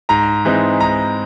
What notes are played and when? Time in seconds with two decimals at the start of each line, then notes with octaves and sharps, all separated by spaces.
0.09 G#2 A#5
0.45 E3 G#3 C4 D#4
0.80 G#2 A#5